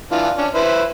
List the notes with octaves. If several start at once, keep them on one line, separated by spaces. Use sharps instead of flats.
E3 D4 F4
C#4 D4
E4 B4 C5